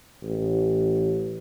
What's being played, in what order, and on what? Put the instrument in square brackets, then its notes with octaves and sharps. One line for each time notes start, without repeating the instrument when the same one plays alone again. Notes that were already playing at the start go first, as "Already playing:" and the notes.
[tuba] A1